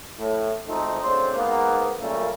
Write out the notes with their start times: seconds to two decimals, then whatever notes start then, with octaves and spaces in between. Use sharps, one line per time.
0.18 A2
0.66 G#1 F2 A3 C4 D#4
1.00 D2 C#3 C4 D4 C5
1.36 G#2 A#3 B3
1.99 F#2 A#2 C#3 G3 A3 A#3